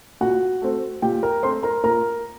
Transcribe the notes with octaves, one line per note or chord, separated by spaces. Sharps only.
A#2 F#4 F#5
A3 C4
A#2 G4 G5
A#4 A#5
A3 C4 C5 C6
A#4 A#5
A#2 A#4 A#5